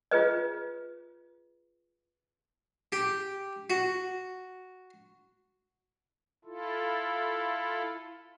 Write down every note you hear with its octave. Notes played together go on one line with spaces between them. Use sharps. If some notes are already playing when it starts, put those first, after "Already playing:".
F4 G#4 B4 D#5
G4
F#4
E4 F4 A4